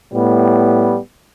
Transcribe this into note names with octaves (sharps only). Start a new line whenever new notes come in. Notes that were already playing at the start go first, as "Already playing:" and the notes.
A2 G3 B3